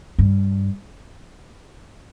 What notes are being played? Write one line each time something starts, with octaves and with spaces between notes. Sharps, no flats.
G2